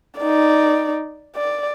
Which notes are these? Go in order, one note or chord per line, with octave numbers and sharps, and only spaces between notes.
D#4 D5
D5